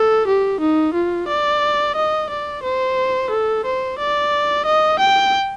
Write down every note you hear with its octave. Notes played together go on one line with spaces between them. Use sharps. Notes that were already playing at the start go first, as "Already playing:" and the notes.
Already playing: A4
G4
D#4
F4
D5
D#5
D5
C5
A4
C5
D5
D#5
G5